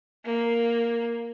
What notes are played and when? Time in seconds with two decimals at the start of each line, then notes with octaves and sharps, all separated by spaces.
0.25 A#3